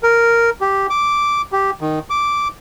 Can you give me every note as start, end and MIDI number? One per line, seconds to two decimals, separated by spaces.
0.03 0.50 70
0.61 0.87 67
0.90 1.42 86
1.52 1.71 67
1.81 1.99 51
2.10 2.48 86